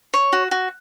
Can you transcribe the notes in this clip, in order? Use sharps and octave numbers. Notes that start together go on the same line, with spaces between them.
C#5
F#4
F#4